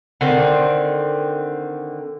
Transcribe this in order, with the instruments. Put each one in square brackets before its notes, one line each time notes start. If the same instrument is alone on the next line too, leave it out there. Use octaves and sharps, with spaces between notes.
[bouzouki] D3 D#3 C4